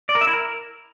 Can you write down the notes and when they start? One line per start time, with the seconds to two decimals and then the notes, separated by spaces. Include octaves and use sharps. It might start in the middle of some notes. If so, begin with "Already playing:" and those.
0.09 D5
0.15 A#4
0.21 E5
0.27 E4
0.33 A#4